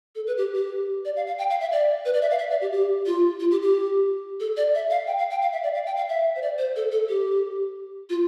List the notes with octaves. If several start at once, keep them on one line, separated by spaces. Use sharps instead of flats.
A4
B4
G4
G4
D5
F5
F5
G5
F5
E5
D5
B4
D5
E5
F5
E5
D5
G4
G4
F4
F4
G4
G4
A4
D5
E5
F5
G5
F5
G5
F5
E5
D5
F5
G5
F5
E5
C5
D5
C5
A4
A4
G4
F4